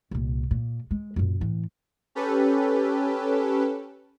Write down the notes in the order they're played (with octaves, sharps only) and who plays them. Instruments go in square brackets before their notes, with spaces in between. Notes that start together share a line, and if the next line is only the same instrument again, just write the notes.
[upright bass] C2 A#2
A#2
G#3
F#2 A#2
A2 E3
[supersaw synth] C#4 G4 A4 B4